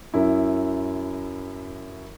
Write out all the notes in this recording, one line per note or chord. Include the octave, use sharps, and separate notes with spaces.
F#2 E4